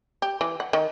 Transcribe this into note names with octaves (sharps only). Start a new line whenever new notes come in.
G4
E3
F#5
D#3